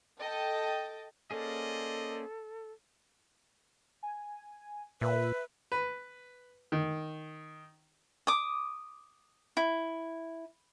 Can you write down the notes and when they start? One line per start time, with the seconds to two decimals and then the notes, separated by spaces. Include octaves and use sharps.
0.20 A4 D#5 G5 A5
1.31 A#3 C#4 G#4 A4 C5 D5 D#5
4.03 G#5
5.01 A#2 B4 E5
5.72 B4
6.72 D#3
8.27 D6 D#6
9.57 E4